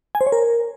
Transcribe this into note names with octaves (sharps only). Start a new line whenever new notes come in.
G#5
C5
C#5
A#4